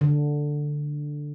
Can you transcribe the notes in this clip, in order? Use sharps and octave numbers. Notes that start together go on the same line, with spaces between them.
D3